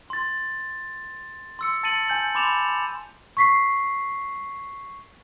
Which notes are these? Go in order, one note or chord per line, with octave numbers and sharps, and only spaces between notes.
C6 A6
C6 E6 C#7
A5 A6 C#7 D#7 F#7
G#5 G6 F#7
B5 C6 D6 A6 E7 F7
C#6 B6 C7